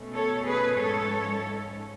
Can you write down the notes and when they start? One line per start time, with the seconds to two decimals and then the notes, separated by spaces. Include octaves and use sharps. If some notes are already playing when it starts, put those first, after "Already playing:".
Already playing: B2 A3 C#4
0.14 A4 C#5
0.45 G#4 B4
0.76 G#2 F3 A3 C#4 A4 C#5